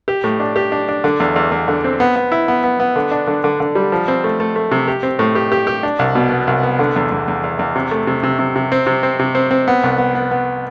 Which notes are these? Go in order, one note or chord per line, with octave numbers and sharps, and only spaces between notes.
G4
A2
D4
G4
D4
D4
D3
E2
E2
E2
D3
C4
B3
B3
E4
B3
B3
B3
D3
D4
D3
D3
D3
G3
F3
C4
A3
A3
A3
C3
G4
C4
A2
G4
G4
G4
D4
C2
B2
B3
C2
B3
D3
E2
E2
E2
E2
E2
C3
A3
C3
C3
C3
C3
C4
C3
C4
C3
C4
C4
B3
C2
B3
B3
B3